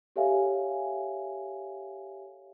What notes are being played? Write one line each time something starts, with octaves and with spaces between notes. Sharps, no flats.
G4 A4 C#5 E5 F5 G#5